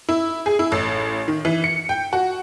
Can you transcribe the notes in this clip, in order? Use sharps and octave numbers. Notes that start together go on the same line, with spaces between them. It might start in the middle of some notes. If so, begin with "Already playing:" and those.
E4
G#4
E4
A1
D#3
E3
C#7
G5
F#4